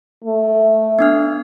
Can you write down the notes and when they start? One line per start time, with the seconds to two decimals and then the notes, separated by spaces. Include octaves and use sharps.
0.25 A3
0.99 B3 D4 F6